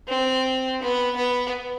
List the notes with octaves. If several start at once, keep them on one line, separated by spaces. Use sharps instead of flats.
C4
B3
B3